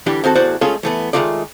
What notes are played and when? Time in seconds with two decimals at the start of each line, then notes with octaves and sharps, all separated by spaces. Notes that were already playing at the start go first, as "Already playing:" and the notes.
0.06 D3 E3 G3 D4 G4
0.24 D#3 C4 F#4 A4
0.35 E2 A2 F#4 C5 D5 F#5
0.61 G#3 A3 C#4 F4 G#4 A4
0.83 E3 A3 B3
1.13 D#3 F#3 G#3 A3 F4 D5